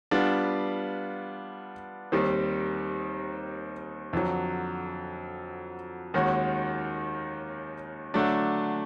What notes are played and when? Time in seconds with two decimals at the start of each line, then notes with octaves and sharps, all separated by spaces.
0.11 G3 B3 D4 F4
2.12 D#2 D#3 G3 C4
4.13 F2 D3 F#3
6.14 D#2 D#3 G#3 C#4 F#4
8.14 D3 F#3 A3 D4